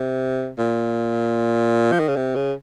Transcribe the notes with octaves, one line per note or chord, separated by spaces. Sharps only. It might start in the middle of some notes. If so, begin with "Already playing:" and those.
Already playing: C3
A#2
F3
D#3
C#3
C3
C#3